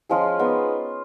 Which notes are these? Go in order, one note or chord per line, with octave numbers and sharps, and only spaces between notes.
F3 G#3 C#4 F4 G#4
G#3 B3 D#4